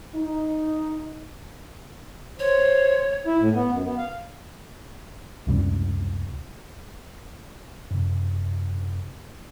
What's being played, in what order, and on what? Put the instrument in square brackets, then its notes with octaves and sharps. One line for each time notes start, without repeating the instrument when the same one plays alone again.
[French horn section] D#4
[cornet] C5 [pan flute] C#5
[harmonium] E4
A2
B3
F#2
B3
F5
[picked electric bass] C#2 F#2 C3 G3
[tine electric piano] F#2 C3